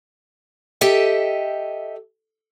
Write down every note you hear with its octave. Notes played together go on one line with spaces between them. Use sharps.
G4 A4 D#5 E5 G5